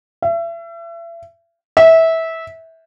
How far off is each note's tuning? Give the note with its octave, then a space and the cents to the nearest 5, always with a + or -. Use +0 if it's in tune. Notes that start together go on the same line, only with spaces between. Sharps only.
E5 +35
E5 -20